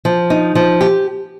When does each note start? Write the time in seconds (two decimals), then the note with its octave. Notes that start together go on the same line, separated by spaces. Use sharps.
0.05 F3
0.30 D#4
0.55 F3
0.81 G4